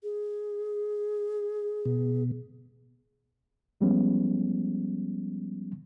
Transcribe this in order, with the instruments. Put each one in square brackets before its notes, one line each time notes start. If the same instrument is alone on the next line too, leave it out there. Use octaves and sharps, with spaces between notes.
[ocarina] G#4
[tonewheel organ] B2
[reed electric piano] E2 F3 G3 G#3 B3 C#4